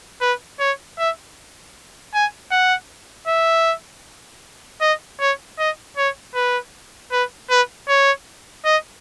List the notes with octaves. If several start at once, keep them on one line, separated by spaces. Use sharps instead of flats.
B4
C#5
E5
G#5
F#5
E5
D#5
C#5
D#5
C#5
B4
B4
B4
C#5
D#5